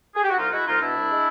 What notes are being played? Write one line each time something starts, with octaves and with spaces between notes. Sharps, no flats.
G#4
G4
F#4
C2 D#4 F4
G#3 E4 F#4
C2 D#4 F4
B2 D4 E4
C2
G#3